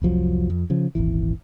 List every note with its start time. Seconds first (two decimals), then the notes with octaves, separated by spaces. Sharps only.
0.02 F1 C2 F3 F#3
0.50 F2
0.70 C#3 F3
0.95 D#1 G#1 E3